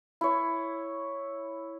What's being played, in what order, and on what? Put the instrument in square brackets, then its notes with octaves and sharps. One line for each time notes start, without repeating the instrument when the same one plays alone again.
[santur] E4 C#5